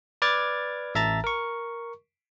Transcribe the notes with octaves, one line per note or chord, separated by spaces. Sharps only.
B4 D5 D6 F6 G#6 A6
A1 E5 A5 A#5 A6
A#4 C#6